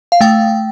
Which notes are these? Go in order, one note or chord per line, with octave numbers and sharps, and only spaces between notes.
F5
A3 G5